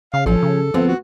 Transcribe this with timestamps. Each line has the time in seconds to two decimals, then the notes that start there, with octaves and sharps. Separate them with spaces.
0.14 C#3 F5
0.26 A1 F3 C#4 A4
0.43 C#3
0.74 D2 F3 B3 C4
0.88 F#4